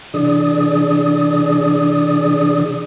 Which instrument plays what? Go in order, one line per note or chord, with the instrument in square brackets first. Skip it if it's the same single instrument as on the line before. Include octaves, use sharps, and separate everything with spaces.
[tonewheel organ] C3 E3 D4 G#4 D5 D#6